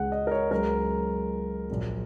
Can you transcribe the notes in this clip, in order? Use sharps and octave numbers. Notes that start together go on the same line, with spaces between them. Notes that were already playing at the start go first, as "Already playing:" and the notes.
Already playing: C#2 C#3 G#3 F#5
D#5
A#4
C#5
C#2 C#3 F#3 A#4
A#1 A#2 F#3